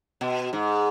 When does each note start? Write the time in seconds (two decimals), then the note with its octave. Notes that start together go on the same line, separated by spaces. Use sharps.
0.21 B2
0.53 G#2